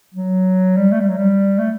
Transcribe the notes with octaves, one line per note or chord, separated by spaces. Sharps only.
F#3
G3
A3
G3
F#3
G3
A3